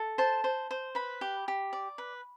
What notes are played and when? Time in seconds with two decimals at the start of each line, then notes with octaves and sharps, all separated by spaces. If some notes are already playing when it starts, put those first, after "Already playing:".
Already playing: A4
0.18 C5 A5
0.44 C5
0.71 C5
0.95 B4 B5
1.21 G4
1.48 G4
1.73 D5
1.98 B4